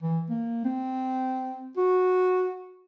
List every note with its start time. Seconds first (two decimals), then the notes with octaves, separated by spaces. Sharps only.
0.02 E3
0.30 A#3
0.65 C4
1.77 F#4